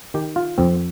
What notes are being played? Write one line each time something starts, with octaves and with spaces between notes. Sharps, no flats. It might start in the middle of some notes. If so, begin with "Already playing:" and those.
D#3 G4
F4
F2 C4